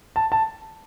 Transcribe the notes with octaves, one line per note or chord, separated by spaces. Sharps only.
A5
A5